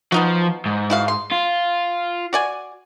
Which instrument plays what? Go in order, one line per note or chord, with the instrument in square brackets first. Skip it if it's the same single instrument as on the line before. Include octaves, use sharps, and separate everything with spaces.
[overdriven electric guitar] F3 [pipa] B3 D#4 F#4
[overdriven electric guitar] G#2
[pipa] E4 F#4 F5
C6
[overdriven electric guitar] F4
[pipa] F#4 D5 G#5